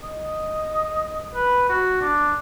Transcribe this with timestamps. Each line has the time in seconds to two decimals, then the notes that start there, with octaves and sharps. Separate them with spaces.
0.03 D#5
1.35 B4
1.69 F#4
2.01 D4